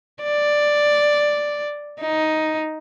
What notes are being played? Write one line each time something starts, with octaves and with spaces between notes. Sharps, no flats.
D5
D#4